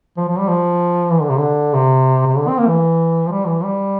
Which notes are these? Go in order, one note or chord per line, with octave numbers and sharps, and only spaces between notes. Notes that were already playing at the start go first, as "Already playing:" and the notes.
F3
F3
G3
F3
E3
D3
C3
D3
C3
C3
D3
C4
A#3
E3
F3
G3
E3
G3